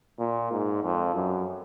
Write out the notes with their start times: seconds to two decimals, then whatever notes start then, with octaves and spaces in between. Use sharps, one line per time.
0.19 A#2
0.51 G#2
0.83 F2
1.15 F#2